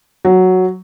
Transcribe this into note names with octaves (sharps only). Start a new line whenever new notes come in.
F#3